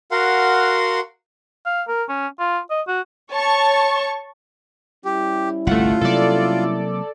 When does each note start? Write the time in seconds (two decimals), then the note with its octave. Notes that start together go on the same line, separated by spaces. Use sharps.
0.11 F#4 A#4 F5 F#5 C6
1.66 F5
1.88 A#4
2.09 C#4
2.39 F4
2.70 D#5
2.88 F#4
3.32 C#5 A5 C#6
5.05 G3 C#4 E4 G4
5.67 G1 C2 A3 F4 F#5
6.01 C3 F#3 A#3 A4 D5